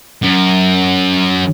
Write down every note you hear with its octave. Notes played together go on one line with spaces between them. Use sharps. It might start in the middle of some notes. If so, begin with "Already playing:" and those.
F#2